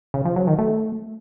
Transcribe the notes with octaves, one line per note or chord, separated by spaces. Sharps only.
C#3
F3
F#3
D#3
A3